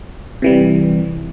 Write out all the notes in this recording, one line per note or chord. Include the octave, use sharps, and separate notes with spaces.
C3 E3 G3